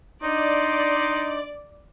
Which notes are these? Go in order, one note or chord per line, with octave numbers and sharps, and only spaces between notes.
D4 D#4 D5 D#5 C6